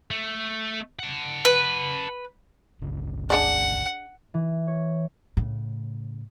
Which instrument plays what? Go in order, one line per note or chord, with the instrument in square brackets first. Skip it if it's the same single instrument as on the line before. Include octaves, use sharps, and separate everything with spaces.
[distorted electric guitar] A3
F#5 A5
[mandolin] B4
[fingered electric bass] G1 C#2 C#3
[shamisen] D4 G#4 D5 [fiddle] F#5
[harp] E3
C#5
[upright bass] A2 C#3